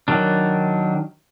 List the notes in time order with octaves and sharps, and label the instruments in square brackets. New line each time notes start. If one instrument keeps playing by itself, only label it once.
[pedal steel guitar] D#3 F#3 D4